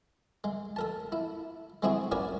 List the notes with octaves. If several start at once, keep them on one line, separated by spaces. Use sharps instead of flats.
G#3
A4 A#4 A5
E4
G#3 A3 C4 E4 F#4 G#4
C#4 F#4 A#4 B4 C#5 D5